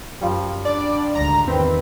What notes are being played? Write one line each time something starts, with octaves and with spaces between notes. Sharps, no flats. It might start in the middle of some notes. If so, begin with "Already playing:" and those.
F#2 F3 G3
D4 D5
G#1 D2 A#5
E2 D#3 C4 B4 G5